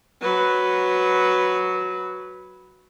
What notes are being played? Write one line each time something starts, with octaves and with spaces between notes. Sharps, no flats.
F#3 B4